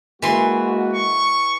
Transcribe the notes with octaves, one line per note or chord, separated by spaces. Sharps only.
E3 G#3 A#3 F#4 C6
C#6